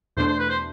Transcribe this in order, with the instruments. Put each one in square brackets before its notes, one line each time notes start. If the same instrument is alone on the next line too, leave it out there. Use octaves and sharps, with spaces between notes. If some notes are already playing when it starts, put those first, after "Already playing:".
[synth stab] E2 B2 A3 D4 [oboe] C5
[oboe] C5
B4
C5